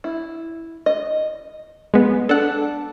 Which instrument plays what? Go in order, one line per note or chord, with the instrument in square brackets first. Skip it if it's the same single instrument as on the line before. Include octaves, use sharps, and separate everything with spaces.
[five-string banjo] E4
D#5
[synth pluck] G#3 B3
[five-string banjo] D4 [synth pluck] A4 F#5